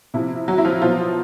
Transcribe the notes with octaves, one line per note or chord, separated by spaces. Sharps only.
C3 F3 E4
F#3 F#4
E4
F3 F4
B2 F3 F#3 F4